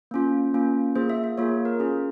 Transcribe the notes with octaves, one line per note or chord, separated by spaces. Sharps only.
A#3 C#4 F4
A#3 C#4 F4
A#3 F4 G#4 C5
E5
E5
A#3 F4 G#4 C#5
A#4
C#4 F4 G#4